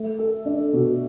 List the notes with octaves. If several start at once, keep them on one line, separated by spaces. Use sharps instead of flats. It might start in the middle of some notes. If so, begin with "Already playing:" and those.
Already playing: A3
A4
D4
B2